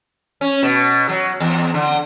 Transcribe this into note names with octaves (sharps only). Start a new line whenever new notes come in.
C#4
B2
F#3
E2
D3